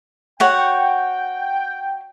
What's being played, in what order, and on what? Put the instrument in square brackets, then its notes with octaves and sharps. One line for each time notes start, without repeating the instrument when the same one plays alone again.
[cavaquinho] F#4 C#5 F#5 [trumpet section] G5